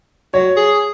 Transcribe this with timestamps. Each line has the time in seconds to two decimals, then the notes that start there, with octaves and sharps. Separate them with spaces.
0.34 F#3 C#5
0.56 G#4